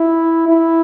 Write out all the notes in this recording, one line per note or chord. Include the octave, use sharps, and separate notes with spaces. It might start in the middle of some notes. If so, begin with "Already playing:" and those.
Already playing: E4
E4